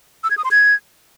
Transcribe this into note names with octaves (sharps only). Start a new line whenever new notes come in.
E6
G#6
D#6
C6
G#6